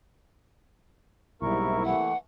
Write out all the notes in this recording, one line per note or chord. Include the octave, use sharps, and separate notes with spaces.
B1 G#2 C3 G3 A#3 E4 A#4 C#6
E3 A3 F#5